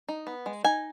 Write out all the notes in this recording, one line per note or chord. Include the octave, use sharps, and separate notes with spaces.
D#4
B3
G#3
D#4 G#5